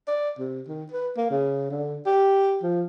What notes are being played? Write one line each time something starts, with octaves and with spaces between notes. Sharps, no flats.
D5
C3
D#3
B4
A#3
C#3
D3
G4
F3